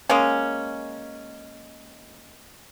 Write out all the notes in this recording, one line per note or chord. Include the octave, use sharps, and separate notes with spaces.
G#3 A#3 C#4